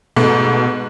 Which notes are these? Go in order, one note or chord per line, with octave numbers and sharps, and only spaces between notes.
G#2 B2 A3